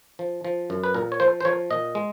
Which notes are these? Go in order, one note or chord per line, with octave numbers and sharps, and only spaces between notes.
F3
F3
F#2
B4
A#2 A#4
C#5
F3 C5
C5
F3 C#5
A#2 D#5
G#3